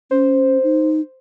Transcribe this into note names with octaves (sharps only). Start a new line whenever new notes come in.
C#4 C5
D#4